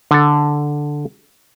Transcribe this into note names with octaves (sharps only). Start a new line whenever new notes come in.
D3 A4